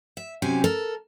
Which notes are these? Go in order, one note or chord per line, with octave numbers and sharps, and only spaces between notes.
E5
F#2 C3 C4 G4 G#5
A4 A#4